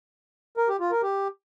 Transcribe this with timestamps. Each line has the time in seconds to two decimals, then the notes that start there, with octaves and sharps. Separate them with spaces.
0.57 A#4
0.69 G4
0.80 F4
0.91 A#4
1.03 G4